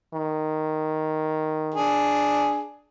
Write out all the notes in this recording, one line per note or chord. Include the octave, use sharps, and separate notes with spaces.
D#3
D4 G#4